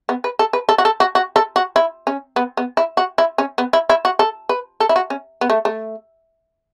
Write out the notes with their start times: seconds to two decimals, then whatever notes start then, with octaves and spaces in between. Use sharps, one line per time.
0.09 B3
0.24 B4
0.39 A4
0.53 B4
0.69 A4
0.78 F#4
0.85 A4
1.00 F#4
1.15 F#4
1.36 A4
1.56 F#4
1.76 E4
2.07 C#4
2.36 B3
2.57 B3
2.77 E4
2.97 F#4
3.18 E4
3.38 C#4
3.58 B3
3.73 E4
3.90 E4
4.05 F#4
4.19 A4
4.49 B4
4.80 A4
4.89 E4
4.96 F#4
5.10 C#4
5.41 B3
5.50 A3
5.65 A3